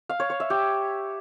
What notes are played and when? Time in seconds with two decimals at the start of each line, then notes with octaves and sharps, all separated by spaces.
0.09 F5
0.20 C#5
0.30 C#5
0.40 E5
0.50 G4